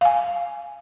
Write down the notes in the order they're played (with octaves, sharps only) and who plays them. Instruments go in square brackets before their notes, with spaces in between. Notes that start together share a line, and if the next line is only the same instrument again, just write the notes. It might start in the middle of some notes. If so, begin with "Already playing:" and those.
[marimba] F5 G#5